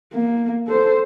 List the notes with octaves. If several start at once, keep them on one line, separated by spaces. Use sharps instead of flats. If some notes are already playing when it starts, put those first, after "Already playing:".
A#3
A4 C5